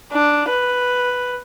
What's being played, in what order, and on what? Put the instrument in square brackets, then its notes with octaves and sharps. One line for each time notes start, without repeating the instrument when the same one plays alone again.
[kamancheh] D4
B4